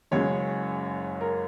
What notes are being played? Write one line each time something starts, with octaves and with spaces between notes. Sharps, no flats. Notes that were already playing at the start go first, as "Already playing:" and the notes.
F#1 F#2 C#3 G#3 C#5
A#4